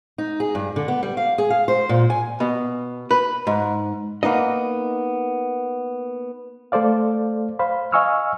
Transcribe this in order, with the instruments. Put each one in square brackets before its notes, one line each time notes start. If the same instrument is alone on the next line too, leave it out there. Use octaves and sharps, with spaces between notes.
[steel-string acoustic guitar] D#4
G#4
G2
D3
B3
G3
F5
G#4
F5
C5
A#2
G#5
[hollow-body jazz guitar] B2
B4
G#2
A#3 B3 D#4 D#5
[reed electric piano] A3 A4 C5 D5 F5
C5 F5 B5
D#5 F5 G#5 C#6 E6 F6